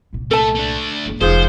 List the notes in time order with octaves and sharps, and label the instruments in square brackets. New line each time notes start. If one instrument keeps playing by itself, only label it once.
[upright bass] C2 A#2
[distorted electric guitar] A3 [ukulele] A4 A5
[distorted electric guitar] A3 D4
[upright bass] F#2 A#3
[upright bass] F1 [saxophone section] G#2 F3 [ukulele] G#4 [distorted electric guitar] C5